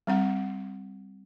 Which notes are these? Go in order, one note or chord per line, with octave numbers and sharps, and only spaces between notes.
G3 C4 F#5